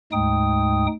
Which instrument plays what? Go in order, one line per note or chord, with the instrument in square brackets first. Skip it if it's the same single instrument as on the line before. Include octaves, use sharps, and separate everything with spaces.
[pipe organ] D2 G#2 G#3 D#4 G5 D#6